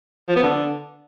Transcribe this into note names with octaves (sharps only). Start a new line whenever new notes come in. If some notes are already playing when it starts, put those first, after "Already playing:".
F3
B3
D3